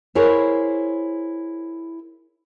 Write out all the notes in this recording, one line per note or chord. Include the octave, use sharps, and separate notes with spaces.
E4 G#4 A#4 C5 C#5